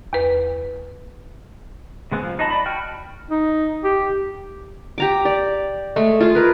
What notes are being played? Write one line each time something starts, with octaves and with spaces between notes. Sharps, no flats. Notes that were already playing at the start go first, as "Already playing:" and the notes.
E2 B4
C#3 G#3 B3 C4
F3
D#4 F#4 D#5 A5 B5
D5 B5
F#4 G5 F6
D#4
G4
G4 A#5 D6
D5
G#3 A3 A4
F4 G#4
A#4 B4